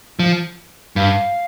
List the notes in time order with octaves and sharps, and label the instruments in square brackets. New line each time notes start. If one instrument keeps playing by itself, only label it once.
[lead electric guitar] F3
[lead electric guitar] G2 [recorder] F5